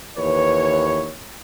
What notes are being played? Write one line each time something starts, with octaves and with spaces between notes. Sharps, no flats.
D#2 E3 B4 C#5